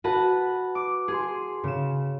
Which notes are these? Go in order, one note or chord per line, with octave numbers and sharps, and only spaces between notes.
F#4 B4 F#5 A5
D6
G#4 C6
C#3 E7